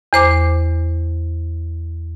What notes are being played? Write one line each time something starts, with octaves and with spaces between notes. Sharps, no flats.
E2 C5 D6